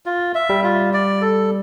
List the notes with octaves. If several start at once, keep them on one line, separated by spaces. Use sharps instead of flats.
F4
E5
G3
F4
D5
A4